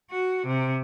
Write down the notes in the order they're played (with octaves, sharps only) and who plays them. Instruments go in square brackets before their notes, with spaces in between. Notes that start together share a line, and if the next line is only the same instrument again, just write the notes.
[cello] F#4
C3